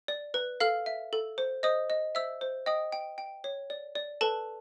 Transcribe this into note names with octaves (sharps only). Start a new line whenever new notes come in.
D5
B4
A4 F5 F6
E5
A4
C5
C5 D#5 D#6
D#5
C5 E5 E6
C5
D#5 G5 D#6
G5
G5
C#5
D5
D5
A4 B4 A5